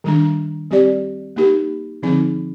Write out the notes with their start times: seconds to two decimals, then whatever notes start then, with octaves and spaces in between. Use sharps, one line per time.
0.04 D#3 G3 D4
0.71 G3 C4 G4 D5
1.36 A#3 D#4 G4 A#4
2.03 D3 F3 C4 D#4 G#4